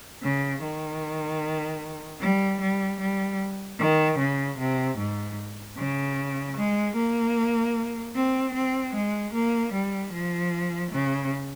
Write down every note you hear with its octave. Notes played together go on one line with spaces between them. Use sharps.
C#3
D#3
G3
G3
G3
D#3
C#3
C3
G#2
C#3
G#3
A#3
C4
C4
G#3
A#3
G3
F3
C#3